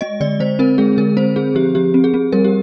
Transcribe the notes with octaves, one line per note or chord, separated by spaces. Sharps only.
G#3 D#5
D3 D5
D3 C5
C4 A#4
G#3 G#4
D3 A#4
C4 C5
C4 G#4
F3 G4
F3 G4
C4
G#4
C4
G3 A#4
G4